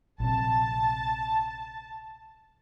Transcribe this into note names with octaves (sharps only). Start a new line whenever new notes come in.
A#1 C3 A5